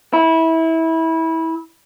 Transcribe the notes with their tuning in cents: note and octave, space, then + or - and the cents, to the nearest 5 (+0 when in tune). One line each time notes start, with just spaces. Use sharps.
E4 -20